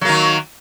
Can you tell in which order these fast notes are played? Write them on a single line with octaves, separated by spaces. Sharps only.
F#3 A#3 D#3